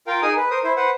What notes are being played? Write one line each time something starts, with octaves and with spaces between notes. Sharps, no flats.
F4 A#4 F5 G5
D#4 G#4 A#4 G#5 D#6
B4
A#4 C5 D#6
E4 C5
B4 C5 F#5